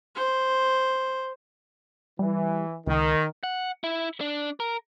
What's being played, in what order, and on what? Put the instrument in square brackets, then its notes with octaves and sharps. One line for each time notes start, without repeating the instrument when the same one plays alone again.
[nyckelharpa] C5
[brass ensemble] E3 [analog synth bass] G3
[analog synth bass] C#2 [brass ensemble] D#3
[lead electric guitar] F#5
E4
D4
A#4